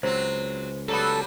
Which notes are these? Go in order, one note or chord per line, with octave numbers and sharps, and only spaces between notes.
C#2 F#3 C4 C5
F#3 G3 B3 A4